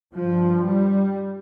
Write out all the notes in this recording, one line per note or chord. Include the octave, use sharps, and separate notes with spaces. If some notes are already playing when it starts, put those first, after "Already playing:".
G2 F3
G3